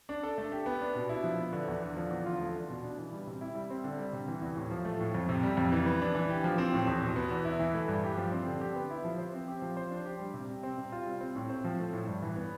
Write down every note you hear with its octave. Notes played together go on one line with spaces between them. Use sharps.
D4
A4
A3
G4
B3
D4
B2
E4
F3
B3
D3
E2
D3
F3
E2
F4
A3
D4
B2
D4
E3
G3
C3
E4
G3
C4
D3
G3
C3
E3
E2
A2
F3
A3
A2
F2
C3
G3
F2
E3
B3
D4
E3
G4
F3
C4
A2
E2
B2
B3
E2
E4
E3
A3
G2
G4
F3
C4
D3
G4
B3
E4
F3
C5
C4
G4
F3
C5
D4
G4
G3
C3
G3
C4
C3
F4
G3
C4
A2
C4
F3
A3
A2
G2
E3
B3